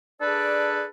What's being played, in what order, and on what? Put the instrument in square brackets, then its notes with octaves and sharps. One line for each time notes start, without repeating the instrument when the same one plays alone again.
[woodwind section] D4 G#4 A4 B4 D5